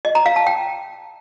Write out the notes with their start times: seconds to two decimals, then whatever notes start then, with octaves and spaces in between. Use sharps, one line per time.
0.05 D#5
0.15 A#5
0.26 F5
0.36 A5
0.47 G5